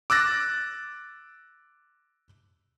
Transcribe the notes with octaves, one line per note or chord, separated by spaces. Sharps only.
D6 E6 F#6 A6 A#6